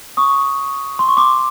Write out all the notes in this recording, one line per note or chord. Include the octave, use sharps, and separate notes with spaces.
C#6 D#6
C6
C#6
C6 D6